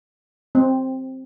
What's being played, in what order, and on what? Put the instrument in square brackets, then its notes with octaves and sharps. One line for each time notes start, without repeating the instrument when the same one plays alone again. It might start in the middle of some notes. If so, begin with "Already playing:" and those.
[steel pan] C4